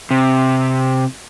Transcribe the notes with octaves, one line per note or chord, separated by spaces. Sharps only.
C3